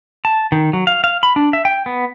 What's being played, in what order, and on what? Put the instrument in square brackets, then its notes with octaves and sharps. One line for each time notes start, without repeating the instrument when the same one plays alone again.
[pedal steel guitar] A5
D#3
F#3
F5
F5
B5
D4
E5
G5
B3